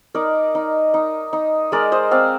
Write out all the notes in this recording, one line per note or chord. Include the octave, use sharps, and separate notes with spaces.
D#4 A#4 D5
D#4
D#4
D#4
G#3 A#4 D5
C5 D#5
C4 D5 F5